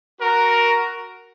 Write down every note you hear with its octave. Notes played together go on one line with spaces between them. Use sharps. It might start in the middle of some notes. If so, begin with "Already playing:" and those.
F#4 A#4